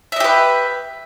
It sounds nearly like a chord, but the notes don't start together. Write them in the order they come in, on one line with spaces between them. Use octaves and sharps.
E5 D#5 G4 B4